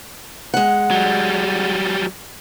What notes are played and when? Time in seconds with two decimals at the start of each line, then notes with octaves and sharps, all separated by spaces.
0.54 G#3 F#5
0.91 F#3 G3